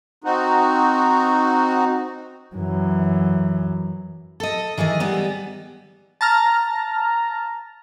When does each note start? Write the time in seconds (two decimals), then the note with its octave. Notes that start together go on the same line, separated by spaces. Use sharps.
0.24 C4 D#4 F#4
2.55 F#2 E3
4.40 A4 D#5
4.77 D#3 E3 G#4 D#5
5.00 G3 G#3 B3
6.21 A5 A#5 F6 A#6